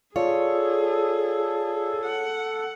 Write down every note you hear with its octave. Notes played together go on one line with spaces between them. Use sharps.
F4 G#4 A4 C#5 D5 F5
F#5